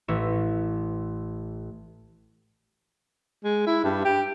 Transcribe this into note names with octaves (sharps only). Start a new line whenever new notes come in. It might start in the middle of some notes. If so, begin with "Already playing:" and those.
A1 C#5 E5
G#3
E4
G2
G4